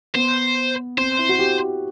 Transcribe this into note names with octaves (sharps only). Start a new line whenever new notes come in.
B3 C5
C4 C5
E4
F#4
G4